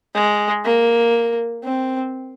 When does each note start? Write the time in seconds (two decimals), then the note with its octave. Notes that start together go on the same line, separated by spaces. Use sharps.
0.14 G#3
0.65 A#3
1.64 C4